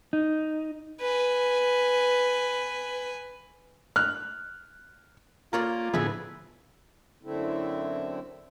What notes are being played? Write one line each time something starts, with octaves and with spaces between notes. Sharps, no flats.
D#4
B4 G#5
F6 F#6
A#3 F4 A#4 C#5 D5
A2 D3 F3 B3 E4 G#4 B4
F#2 D3 A3 C4 E4